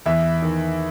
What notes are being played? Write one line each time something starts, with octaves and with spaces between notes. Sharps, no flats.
E2 E5
D#3